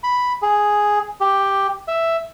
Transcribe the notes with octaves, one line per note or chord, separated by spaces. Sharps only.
B5
G#4
G4
E5